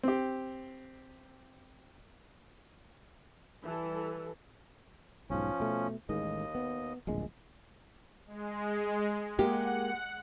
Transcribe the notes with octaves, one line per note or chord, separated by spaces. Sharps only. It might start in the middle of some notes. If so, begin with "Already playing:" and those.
C4 G4
E3 G3 A4
B1 G#2 F3 C#4
B2 A3
A1 D#2 D#3 G#3 D#5
B3
D1 A#1 G#3
G#3
G#3 A#3 G4 F#5